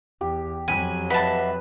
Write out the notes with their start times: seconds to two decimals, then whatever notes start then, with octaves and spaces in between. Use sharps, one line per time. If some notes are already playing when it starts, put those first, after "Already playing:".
0.21 E2 G4
0.68 F2 F#3 G#5 B5
1.10 B4 D#5 E5 F#5 A5 B5